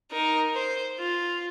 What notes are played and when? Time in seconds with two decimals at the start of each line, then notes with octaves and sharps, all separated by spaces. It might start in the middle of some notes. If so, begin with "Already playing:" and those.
0.12 D#4 A#4
0.55 C5
0.99 F4